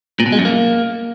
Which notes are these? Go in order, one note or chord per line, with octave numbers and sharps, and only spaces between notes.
A#2
B2
G#3
F#2
A#3